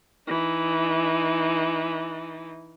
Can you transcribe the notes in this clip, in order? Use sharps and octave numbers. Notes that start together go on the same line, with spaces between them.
E3 D#4